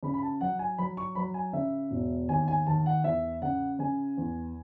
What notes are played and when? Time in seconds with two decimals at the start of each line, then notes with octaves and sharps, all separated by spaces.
0.03 C#3 B5
0.14 B5
0.22 A5
0.41 F#3 F#5
0.59 G#5
0.78 F#3 B5
0.97 C#6
1.15 F#3 B5
1.34 G#5
1.53 C#3 E5
1.91 E1
2.29 D#2 G#5
2.48 G#5
2.67 D#2 A5
2.86 F#5
3.04 E2 E5
3.42 C#3 F#5
3.79 C#3 G#5
4.17 E2